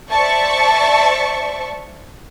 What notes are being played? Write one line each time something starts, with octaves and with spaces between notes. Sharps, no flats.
C5 D5 E5 A5 C#6